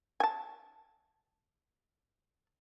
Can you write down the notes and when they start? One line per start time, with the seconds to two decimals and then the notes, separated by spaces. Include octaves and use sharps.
0.20 G#5 A5